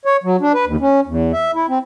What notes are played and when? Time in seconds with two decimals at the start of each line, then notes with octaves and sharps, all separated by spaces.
0.05 C#5
0.24 F#3
0.41 D4
0.54 B4
0.66 D#2
0.81 C#4
1.07 E2
1.33 E5
1.54 E4
1.69 C4